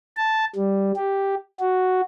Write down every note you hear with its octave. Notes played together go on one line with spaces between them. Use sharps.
A5
G3
G4
F#4